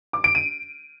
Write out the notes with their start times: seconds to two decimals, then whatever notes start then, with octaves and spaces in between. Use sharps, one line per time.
0.13 D6
0.24 D7
0.35 D#7